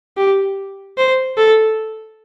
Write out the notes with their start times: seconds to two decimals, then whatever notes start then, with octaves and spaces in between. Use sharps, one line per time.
0.17 G4
0.98 C5
1.38 A4